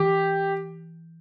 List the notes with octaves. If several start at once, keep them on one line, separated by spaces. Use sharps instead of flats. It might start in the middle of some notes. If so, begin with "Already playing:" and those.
Already playing: E3 G4